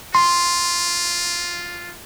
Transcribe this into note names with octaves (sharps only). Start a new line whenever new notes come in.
F4 C6